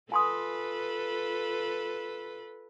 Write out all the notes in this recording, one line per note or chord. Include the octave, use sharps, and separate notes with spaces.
F4 A4 B4 G#5 C6 D#6